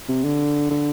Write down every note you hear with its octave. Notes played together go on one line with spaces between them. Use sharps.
C3
D3
D3